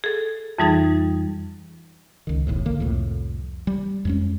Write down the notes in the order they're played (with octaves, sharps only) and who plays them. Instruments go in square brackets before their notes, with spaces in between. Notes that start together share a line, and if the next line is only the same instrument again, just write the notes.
[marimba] G#4 A4
F2 E3 G3 D#4 G#4 A6
[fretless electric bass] C#2 D#3
F1 B1 E2 A2
G#1 D3 A#3
C2 F2 A2
G3
F2 G#3 C#4